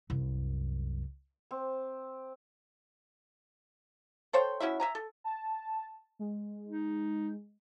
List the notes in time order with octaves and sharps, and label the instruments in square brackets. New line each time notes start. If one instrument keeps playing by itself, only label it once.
[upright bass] C2 F#2
[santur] C4
[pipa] A4 C5 C#5 G5
C#4 E4 F#4 E5
E5 G#5 A#5
A4
[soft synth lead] A5
G#3
[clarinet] D#4